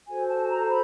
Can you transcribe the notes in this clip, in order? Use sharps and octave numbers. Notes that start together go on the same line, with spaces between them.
F#4 A4 C5 G#5
A5
A#5
B5